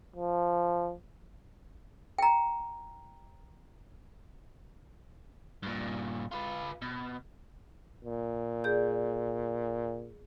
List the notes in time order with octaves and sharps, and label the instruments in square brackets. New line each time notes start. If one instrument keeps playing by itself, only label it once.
[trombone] F3
[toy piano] G5 A#5
[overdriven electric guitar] G2 A#2
F4 B4
B2
[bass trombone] A#2
[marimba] G#4 D5 G6